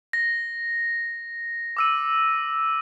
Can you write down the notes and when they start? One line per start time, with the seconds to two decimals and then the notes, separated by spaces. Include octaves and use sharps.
0.13 A#6
1.77 D6 E6 D#7